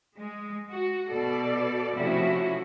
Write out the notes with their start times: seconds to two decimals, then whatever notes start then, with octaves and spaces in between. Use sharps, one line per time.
0.17 G#3
0.72 F#4
1.11 B2 A4 D5
1.96 C3 F3 A3 C#4 E4 F#4